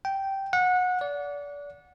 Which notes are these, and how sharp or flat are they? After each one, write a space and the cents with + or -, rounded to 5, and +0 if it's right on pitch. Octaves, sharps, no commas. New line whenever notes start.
G5 -10
F#5 -25
D5 -30